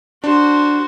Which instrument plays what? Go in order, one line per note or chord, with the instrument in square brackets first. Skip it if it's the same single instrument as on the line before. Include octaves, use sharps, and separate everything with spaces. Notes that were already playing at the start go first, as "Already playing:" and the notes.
[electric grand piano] D4 [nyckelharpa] F#4 C5